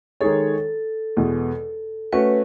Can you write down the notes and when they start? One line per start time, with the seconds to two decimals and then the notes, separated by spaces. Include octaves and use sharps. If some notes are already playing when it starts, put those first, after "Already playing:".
0.21 D#3 G#3 D#4 G#4 A4 C#5
1.17 E2 B2 G#3
2.12 A3 C#4 F#4 B4